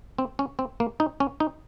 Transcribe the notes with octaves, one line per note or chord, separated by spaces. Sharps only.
C4
C#4
C4
A#3
D#4
C#4
D#4